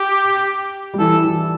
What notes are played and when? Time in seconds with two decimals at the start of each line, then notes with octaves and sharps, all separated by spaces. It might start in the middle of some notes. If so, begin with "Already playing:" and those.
Already playing: G4
0.94 G3
0.99 E3 A4
1.25 E3